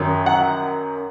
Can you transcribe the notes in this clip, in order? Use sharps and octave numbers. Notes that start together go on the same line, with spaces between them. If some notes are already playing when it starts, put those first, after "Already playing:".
Already playing: F#2 D#3 F#3
F#5